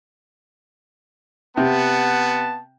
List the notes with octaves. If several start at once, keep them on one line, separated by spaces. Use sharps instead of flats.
C3 B3 F#5 A5